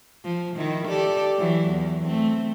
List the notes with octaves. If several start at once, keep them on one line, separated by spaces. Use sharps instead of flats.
F3
D#3 E4
G4 A4 D5
E3 F#3
E2
A3 C4